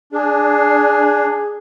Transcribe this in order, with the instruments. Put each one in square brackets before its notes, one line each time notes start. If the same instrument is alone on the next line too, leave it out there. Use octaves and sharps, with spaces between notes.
[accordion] D4 [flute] G#4